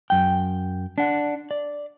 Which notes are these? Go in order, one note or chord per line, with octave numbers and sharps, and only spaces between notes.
F#2 G5
D4 F#5
D5